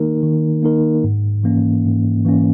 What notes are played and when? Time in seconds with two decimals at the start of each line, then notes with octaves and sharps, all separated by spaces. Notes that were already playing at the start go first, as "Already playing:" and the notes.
Already playing: D#3 A#3 D#4 A#4
0.23 D#3
0.63 A#3 D#4 A#4
1.04 G#2
1.44 E3 A#3 C#4
1.84 G#2
2.25 E3 A#3 C#4